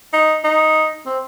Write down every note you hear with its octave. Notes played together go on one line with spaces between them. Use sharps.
D#4
D#4
C4